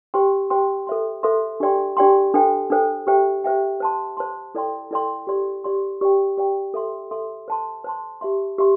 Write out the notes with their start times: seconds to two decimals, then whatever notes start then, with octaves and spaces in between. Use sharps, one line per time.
0.14 G4 C5 G5 C6
0.50 G4 C5 G5 C6
0.87 A4 C5 E5 C6
1.23 A4 C5 E5 C6
1.60 D4 G4 D5 G5 C6
1.97 D4 G4 D5 G5 C6
2.34 D4 A4 C5 G5
2.70 D4 A4 C5 G5
3.07 G4 C5 E5 G5
3.44 G4 C5 E5 G5
3.80 C5 A5 C6
4.17 C5 A5 C6
4.55 E4 A4 D5 G5 C6
4.91 E4 A4 D5 G5 C6
5.27 G4 D5 C6
5.64 G4 D5 C6
6.01 G4 D5 G5
6.38 G4 D5 G5
6.74 A4 E5 C6
7.11 A4 E5 C6
7.48 C5 A5 C6
7.84 C5 A5 C6
8.21 G4 E5 C6
8.58 G4 E5 C6